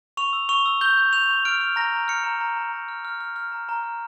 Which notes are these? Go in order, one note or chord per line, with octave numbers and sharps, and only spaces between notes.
C#6 F7
E6
C#6 F7
E6
G6 G7
G6
G6 F7
C#6
F6 D7
F6
A#5 A#6
A#5
F6 C#7
A#5
A#5
A#5
A#5
F6
F6
F6
F6
A#5
A#5
F6